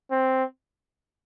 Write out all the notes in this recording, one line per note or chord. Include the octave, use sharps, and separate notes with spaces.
C4